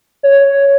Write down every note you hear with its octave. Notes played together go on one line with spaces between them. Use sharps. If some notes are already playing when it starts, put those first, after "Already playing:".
C#5